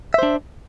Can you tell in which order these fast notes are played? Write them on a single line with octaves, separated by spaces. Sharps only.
E5 C5 D4